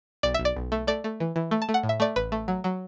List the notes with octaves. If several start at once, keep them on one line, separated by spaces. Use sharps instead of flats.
B1 D5
B1 E5
D5
B1
A3
A3 D5
A3
E3
E3
A3
A5
A3
F#5
A2
E5
A3 D5
A1 B4
A3
F#3
F#3